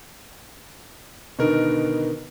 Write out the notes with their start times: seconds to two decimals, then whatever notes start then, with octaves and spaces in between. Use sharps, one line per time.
1.39 B2 D3 D#3 B3 A#4